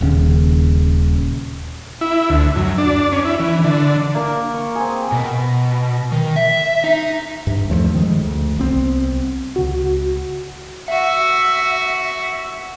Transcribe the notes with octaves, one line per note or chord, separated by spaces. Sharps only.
D#1 D#2 C#3
E4
D2
F#2
D4
C#4
E4
E3
D3
A#3 A#4
C#6
C4 G#4
B2
D#3
E5
D#4
G2
D#2 F3 F#3 A3
F#2 D#3 F3 G#3
D2
C2 B3 C4
C#2 F#4
F#4 E5